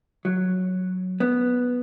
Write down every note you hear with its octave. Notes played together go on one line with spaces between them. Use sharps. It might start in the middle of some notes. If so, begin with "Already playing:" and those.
F#3
B3